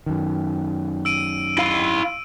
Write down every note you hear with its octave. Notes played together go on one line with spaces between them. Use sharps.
F#2 D#3
E6 D7 D#7
E4 F5